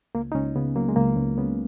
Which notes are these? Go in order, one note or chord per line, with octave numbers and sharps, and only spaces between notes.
C#2 A#3
D#4
C#2 C#4
C#3 B3
F#3 A#3
G#3
C#2 A#3
C#2
C#3 B3